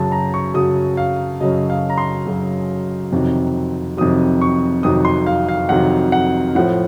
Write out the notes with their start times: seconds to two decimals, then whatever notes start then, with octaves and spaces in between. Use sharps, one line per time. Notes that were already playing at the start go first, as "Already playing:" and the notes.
Already playing: F#2 C#3 F#3 A5
0.12 A#5
0.34 C#6
0.54 F#2 C#3 F#3 D#6
0.97 F5
1.40 F#2 C#3 F#3 D#5
1.70 F5
1.90 A#5
1.98 C6
2.26 F#2 C#3 F#3
3.12 F2 C3 D#3 F#3
3.97 F2 C3 D#3 F#3 D#6
4.41 C#6
4.83 F2 C3 D#3 F#3 D#6
5.05 C6
5.26 F5
5.49 F5
5.69 F2 C3 D#3 F#3 F#5
6.12 F#5
6.55 A2 F3 F#5